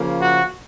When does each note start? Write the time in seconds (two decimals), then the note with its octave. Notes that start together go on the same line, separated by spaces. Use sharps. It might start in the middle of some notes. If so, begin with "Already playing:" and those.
Already playing: C#3 F3 A#3
0.20 F#4